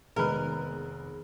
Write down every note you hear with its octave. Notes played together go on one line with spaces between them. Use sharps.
F1 D#3 G#3 B3 G#4 A#4 B4